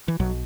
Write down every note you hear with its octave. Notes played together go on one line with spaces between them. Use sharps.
E3
B1 B2 F#3